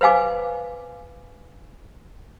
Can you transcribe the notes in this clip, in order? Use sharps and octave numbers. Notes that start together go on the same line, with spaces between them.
B4 C5 F5 G#5 D6